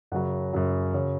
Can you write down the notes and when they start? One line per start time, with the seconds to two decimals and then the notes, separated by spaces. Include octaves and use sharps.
0.12 F#2 F#5
0.14 C#3 F#3
0.53 F#2 C#3 F#3
0.94 C#3 F#3